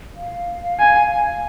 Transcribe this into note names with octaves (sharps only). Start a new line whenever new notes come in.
F5
G#5